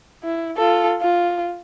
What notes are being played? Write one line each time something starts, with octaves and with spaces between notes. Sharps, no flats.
E4
F4 A4
F4